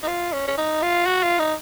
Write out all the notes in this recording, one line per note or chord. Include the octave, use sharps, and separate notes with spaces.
D#4
F4
C#4
C#4
D#4
F4
F#4
F4
D#4